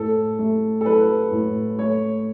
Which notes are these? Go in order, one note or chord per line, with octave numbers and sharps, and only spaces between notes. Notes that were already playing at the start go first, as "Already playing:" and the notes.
Already playing: A2 A4
A3
A4
F#3 B4
A2
A3 C#5